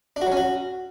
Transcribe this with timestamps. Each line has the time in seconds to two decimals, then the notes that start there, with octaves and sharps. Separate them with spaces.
0.16 D4
0.22 F#4
0.27 F#3
0.32 C#4
0.37 F#4